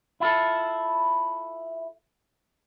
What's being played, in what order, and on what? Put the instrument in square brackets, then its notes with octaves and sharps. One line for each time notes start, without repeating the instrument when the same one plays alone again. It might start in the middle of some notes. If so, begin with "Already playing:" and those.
[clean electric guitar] E4 F4 A4